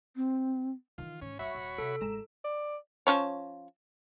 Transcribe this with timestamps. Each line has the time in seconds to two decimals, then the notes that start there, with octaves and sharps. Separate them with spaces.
0.16 C4
0.98 D#3 E3 F4
1.22 G#2 C#4
1.39 G1 F#4 C#5 E5 B5 C#6
1.55 D#1
1.78 C3 A4
2.01 A1 G#3 A#5 E7
2.44 D5
3.07 F3 C#4 C#5